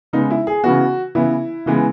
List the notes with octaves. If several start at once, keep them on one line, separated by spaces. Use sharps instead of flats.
C#3 G#3 B3 D#4
E4
G#4
C#3 E3 B3 F#4
C#3 E3 B3 E4
C#3 E3 G#3 B3